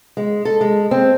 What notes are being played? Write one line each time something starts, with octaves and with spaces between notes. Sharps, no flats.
G#3
A4
G#3
C4